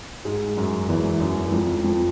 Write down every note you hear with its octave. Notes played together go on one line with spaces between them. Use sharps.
G#2 G#3
F#2 F#3
E2 E3
F#2 F#3
E3
F2 F3
F2 F3